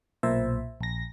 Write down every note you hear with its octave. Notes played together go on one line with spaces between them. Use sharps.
B1 A#2 C5 E5
A#1 A#6